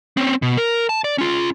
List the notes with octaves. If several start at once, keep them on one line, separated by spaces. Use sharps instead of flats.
C4 C#4
B2
A#4
A5
D5
C#4 F4